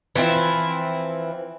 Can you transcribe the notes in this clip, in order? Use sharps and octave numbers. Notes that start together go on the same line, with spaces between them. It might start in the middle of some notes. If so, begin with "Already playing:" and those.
E3 F3 C4 E4